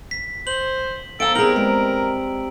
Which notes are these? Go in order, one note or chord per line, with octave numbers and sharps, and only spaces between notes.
B6
C5 F#7
B2 F3 A4 F5 G5 A#5 E6 D7
G3 B3 C4 D#4 G#4 A#4 A#5 F#7
G#3 C4 D#5